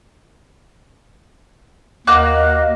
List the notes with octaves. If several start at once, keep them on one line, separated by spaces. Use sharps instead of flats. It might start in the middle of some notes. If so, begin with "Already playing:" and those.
D#2 A#3 F#4 D#5 F5 D6 F#6